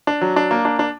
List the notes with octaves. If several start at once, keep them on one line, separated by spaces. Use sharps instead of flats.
D4
F#3
D4
A#3
D4
D4